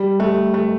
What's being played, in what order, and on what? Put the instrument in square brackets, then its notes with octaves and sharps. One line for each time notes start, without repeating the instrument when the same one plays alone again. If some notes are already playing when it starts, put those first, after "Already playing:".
Already playing: [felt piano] G3
A3
A3